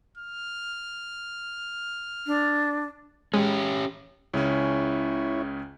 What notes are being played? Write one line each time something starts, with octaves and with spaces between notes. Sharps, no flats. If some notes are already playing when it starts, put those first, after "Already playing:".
F6
D4
G#3 C#4 G4
C#2 C#3 C#4 E4 C#5